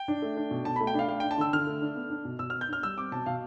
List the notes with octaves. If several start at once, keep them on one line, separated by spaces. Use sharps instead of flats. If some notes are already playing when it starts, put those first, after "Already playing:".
Already playing: G5
D4
A3
D4
B2
B2 A5
A3 B5
G5
D4 F5
A3 F5
D4 G5
A5
D3 E6
D3 F6
A3
D4
B3
D4
B2
B2 E6
B3 F6
G6
D4 F6
G3 E6
C4 D6
B2 A5
B2 F5